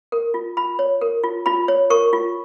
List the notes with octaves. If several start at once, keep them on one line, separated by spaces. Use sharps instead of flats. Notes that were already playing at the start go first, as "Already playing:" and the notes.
A#4
F4
F4 B5
C#5
A#4
F4
F4 B5
C#5
A#4 C#6
F4